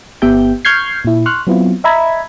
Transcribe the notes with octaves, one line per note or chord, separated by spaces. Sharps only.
G1 B3 G4 E5 G5 G6
C#6 F6 G6 G#6 C7
A#2 E4
C6 C#6 F6 F#6
F#3 B3 C4 E4 F4
D#5 E5 A#5 B5 G#6